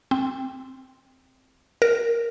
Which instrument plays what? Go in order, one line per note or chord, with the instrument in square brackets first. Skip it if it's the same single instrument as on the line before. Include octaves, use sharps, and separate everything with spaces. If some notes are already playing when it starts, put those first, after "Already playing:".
[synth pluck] C4
A#4